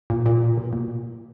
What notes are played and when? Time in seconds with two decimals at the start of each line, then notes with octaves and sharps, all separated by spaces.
0.10 A#2
0.26 A#2
0.57 B2
0.73 A#2